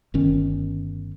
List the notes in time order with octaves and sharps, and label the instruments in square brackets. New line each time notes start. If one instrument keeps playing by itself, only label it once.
[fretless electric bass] G1 D#3 C#4